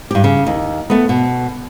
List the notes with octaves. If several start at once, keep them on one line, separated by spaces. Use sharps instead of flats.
G2 G4
C#3
D#2
A3 B3
B2